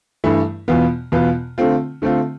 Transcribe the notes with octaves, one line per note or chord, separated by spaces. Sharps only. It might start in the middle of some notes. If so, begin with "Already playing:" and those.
G2 E3 A3 E4
E2 B2 B3 F4
E2 B2 B3 F4
D3 A3 C4 F4
D3 A3 C4 F4